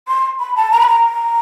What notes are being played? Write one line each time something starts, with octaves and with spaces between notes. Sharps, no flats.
C6
B5
A5
A#5
B5
A#5